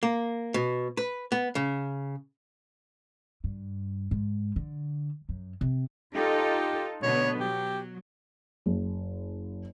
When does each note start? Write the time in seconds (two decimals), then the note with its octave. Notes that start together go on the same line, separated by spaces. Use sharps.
0.03 A#3
0.54 B2
0.97 B4
1.32 B3
1.55 C#3
3.44 G2
4.11 G#2
4.56 D3
5.29 F#2
5.61 C3
6.15 D#4 F4 G4 A4
7.03 B2 D3 B3 C#5
7.40 F#3 G4
8.66 F#1